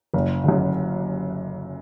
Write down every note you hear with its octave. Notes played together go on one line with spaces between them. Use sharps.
F#1
F#2 D3